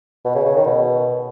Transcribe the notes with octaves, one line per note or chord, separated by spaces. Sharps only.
B2
C#3
C#3
D#3
B2